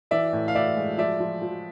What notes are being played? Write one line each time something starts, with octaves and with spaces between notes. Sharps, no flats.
E3 D5 E5
A2
F5
A2 D5 E5
G#3
F3 D5 E5
F3
F3